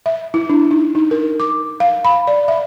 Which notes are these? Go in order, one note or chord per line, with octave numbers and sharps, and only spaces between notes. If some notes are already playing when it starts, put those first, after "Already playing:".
E5
E4
D4
D#4
D#4
A#4
D6
F5
B5
D5
E5